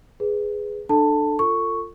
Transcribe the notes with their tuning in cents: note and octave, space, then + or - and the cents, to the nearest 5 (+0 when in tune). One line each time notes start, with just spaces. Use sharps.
G#4 +0 B4 +0
D4 +30 A4 -5 A5 +15
F4 -5 A4 +30 C#6 +0